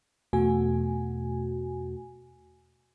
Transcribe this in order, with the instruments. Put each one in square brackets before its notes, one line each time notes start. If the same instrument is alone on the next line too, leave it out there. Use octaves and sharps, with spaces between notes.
[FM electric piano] E2 B2 A3 F#4 G#5